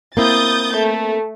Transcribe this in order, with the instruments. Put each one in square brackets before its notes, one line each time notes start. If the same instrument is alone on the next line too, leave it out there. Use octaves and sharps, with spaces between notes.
[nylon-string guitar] A#3 C4 E4 [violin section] D#6 G6 A6
[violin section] A3